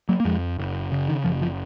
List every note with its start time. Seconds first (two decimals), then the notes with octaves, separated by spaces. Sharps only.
0.09 F#3 A#3
0.20 A#3
0.25 F2 F3 G#3
0.58 F#1
0.92 C#3
1.08 D#3
1.24 F#1 F3
1.41 F3